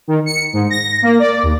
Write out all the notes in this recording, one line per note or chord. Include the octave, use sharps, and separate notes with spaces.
D#3
C#7
G#2
A#6
A#3
D5
D#2